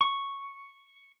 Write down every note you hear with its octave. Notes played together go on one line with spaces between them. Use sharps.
C#6